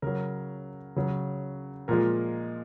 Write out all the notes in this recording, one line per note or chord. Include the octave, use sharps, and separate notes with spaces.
C#3 F#3 A#4
C#3 F#3
A#2 F3 G#3 A#4